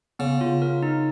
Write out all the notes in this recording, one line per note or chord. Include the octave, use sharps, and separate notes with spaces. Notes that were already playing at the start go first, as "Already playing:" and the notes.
C#3 B3
F4
A#4
D#4